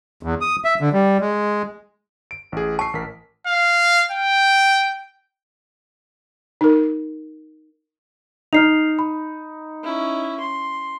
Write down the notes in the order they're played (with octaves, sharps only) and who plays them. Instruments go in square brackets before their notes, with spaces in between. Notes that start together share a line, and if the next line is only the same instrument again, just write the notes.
[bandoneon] E2
D#6
E5
D3
G3
G#3
[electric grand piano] D7
A1 G#4
[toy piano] A5 [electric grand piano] C#6 C7
[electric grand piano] A1 A#4 B6
[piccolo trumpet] F5
G5
[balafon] D#4 A#4
[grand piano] D#4 [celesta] F6 C7 F7
[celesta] B5
[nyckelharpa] C#4 E4
C6